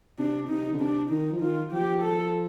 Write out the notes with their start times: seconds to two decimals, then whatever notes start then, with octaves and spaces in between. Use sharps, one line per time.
0.19 C3 D4
0.49 C3 D#4
0.73 D3
0.80 C3 D4
1.10 D#3 D#4
1.32 F3
1.41 D#3 F4
1.72 F3 G4
2.03 A4